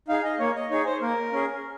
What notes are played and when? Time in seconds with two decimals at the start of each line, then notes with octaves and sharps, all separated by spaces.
0.08 D#4 G#4 F5
0.25 D#5
0.39 A#3 C#5
0.55 D#5
0.71 D#4 G#4 C#5
0.86 C5
1.01 A#3 A#4
1.33 C#4 G#4